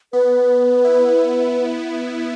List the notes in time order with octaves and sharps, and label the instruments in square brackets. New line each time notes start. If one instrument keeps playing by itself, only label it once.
[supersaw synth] B3 [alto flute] B4
[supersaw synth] E4